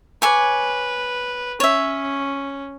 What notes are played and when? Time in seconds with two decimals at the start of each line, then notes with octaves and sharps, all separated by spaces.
0.22 B4 C#5 G#5 D6
1.60 C#4 C#5 E5